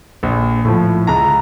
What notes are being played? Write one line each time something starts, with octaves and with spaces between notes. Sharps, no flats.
A#1
A2 F3
C#2 A#5